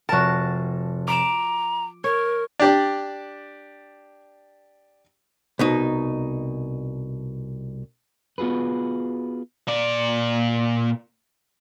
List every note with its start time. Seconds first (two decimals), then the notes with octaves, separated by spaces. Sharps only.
0.09 F1 F#4 A#4 A5
1.08 A#5 D6 D7 E7
2.04 A#4 C#5
2.59 D4 G4 D5
5.59 C2 B2 D#4
8.38 B3 F4 F#4 G#4 B4
9.68 A#2 D5